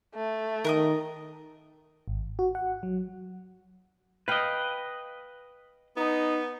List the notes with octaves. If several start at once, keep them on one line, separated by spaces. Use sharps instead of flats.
A3
D#3 A#4 B4 D#5
G#1
F#4
F#5
F#3
B4 D#5 F5 G5
B3 D#4